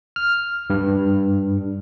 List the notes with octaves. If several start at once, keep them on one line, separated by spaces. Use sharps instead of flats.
F6
G2